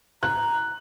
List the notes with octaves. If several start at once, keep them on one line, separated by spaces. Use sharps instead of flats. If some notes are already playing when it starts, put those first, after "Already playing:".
A#5 F#6